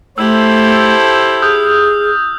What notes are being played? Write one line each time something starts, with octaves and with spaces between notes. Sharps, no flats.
A3 E4 G4 A4 C5 E6
G#4 D#6 F6 G6